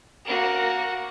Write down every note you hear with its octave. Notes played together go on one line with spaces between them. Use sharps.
A#3 F#4